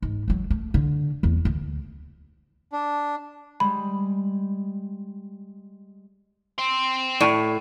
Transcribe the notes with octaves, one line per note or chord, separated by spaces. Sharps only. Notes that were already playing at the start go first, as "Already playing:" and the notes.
G#2
C#2 F#3
A3
D3
E2 A#3
D2
D4
G3 G#3 B5
G5 C6
A2 D5 C#6 D#7